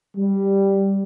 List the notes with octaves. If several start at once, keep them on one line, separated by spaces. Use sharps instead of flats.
G3